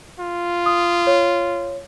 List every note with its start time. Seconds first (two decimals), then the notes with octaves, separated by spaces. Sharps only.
0.19 F4
0.66 D#6
1.07 C#5